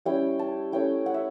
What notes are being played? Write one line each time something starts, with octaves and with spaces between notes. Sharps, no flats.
G3 C#4 E4 G5
A5
A3 C#4 E4 G5
F#5
E5